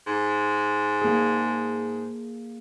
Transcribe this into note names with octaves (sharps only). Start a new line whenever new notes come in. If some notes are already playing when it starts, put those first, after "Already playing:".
G#2
A#3 G#4